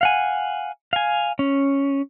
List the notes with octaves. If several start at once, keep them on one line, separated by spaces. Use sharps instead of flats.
F5 F#5 G#5
F5 G#5
C#4